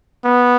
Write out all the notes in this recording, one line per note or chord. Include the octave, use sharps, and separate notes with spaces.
B3